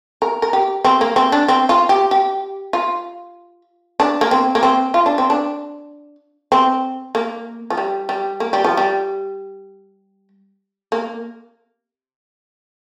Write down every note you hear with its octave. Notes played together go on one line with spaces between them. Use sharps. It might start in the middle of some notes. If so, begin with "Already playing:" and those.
A#4
A#4
G4
C4
A#3
C4
D4
C4
F4
G4
G4
F4
D4
A#3
C4
A#3
C4
F4
D4
C4
D4
C4
A#3
F3
G3
G3
A#3
G3
F3
G3
A#3